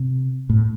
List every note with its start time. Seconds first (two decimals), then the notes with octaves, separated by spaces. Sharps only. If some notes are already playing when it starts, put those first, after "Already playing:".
Already playing: C3
0.50 A2